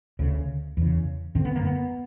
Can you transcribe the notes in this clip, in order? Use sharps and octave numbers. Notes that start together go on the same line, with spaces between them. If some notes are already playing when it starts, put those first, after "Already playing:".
D2 C#3
E2 C#3
F#2 D3 C4
B3
A#3
B3